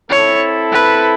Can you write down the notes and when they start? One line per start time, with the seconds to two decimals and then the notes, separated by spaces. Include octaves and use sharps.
0.10 C4 E4 A4 C#5
0.72 B4